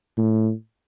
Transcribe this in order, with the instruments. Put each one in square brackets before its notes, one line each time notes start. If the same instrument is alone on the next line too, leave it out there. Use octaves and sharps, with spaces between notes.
[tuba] A2